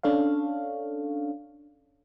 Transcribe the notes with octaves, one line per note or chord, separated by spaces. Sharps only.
C#4 D4 A4 C#5 F5